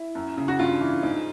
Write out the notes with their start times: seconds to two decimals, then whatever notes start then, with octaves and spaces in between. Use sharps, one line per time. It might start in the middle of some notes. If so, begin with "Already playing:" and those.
Already playing: E4
0.15 F#2
0.37 C#3
0.48 F#4
0.59 G2 F4
0.81 E3
1.03 G#2